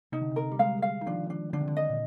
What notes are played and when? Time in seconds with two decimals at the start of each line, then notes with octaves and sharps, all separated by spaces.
0.12 C3 D#4
0.22 D3
0.32 C3 A#4
0.52 G3
0.59 G#3 F5
0.82 F5
1.01 D#3
1.06 F3 D4
1.30 D4
1.53 D3 D4
1.61 C3
1.68 D3
1.77 D#5
1.90 A#2